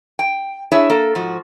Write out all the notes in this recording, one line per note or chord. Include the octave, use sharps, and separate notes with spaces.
G5
D4 E4 G#4 C#5 E5
A#3 A4
G#2 F3 F#4